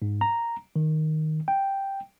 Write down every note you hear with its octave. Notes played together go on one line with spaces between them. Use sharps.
G#2
A#5
D#3
G5